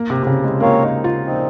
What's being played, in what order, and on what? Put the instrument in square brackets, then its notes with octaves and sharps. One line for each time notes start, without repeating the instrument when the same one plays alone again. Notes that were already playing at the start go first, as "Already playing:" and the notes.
Already playing: [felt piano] A#3
C3
C3
C#3
G#3
[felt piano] A#3 [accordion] C4 F4 A#4 C#5 F5
[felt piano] D#4
F4
[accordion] A#2 F3 C4 D#4